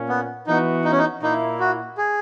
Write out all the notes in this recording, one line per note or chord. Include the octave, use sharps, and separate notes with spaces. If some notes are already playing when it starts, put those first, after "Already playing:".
Already playing: A#2 A#3 C#4
B3
E3 B3 D#4 F#4
D#4
C#4
D#4
A#2 A#3 D#4 E4
F#4
G#4